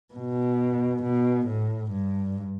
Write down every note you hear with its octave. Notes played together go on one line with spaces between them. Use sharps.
B2
B2
A2
G2